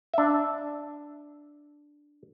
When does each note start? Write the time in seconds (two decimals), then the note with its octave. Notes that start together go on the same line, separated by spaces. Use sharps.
0.14 D4 E5